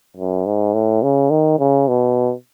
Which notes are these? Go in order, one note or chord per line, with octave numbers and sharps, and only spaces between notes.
F#2
G#2
A2
C#3
D#3
C#3
B2